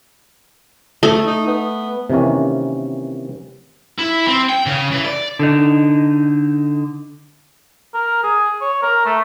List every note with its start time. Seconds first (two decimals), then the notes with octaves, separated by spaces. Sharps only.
1.03 A3
1.27 D#4
1.47 B3
2.10 C3 D#3 E3 A#3 C#4
3.98 E4
4.27 C4
4.49 G5
4.66 C#3
4.92 E3
5.05 D5
5.39 D3 D#4
7.94 A#4
8.23 G#4
8.61 C#5
8.82 A#4
9.06 A3